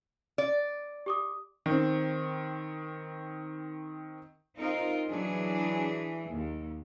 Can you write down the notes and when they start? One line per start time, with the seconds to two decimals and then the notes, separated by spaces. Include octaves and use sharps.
0.38 D5
1.06 G4 D6 D#6
1.66 D#3 C4
4.57 C4 D#4 F4 A#4
5.11 E3 F#3 D4 G#4
6.31 D#2